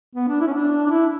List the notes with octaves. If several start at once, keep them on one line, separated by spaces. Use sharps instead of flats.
B3
D4
E4
C#4
D4
D4
E4